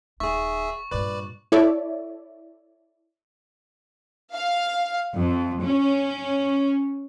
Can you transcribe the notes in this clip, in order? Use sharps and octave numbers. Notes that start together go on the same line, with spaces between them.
D#1 D#4 G#4 E5 C#6
G2 A#2 B4 D5
E4 A4 C#5 D5 E5
F5
F2
C#4